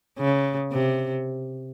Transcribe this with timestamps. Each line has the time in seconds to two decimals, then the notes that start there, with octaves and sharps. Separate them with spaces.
0.18 C#3
0.72 C3